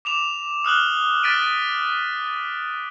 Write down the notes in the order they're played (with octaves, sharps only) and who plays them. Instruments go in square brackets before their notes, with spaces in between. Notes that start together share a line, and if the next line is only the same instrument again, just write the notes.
[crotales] D6 E7 F7
D#6 F6 F#6 F#7
F6 A6 B6 D7 D#7
A6